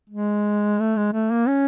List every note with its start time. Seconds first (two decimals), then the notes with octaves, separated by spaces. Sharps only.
0.09 G#3
0.79 A3
0.97 G#3
1.13 A3
1.31 A#3
1.48 C#4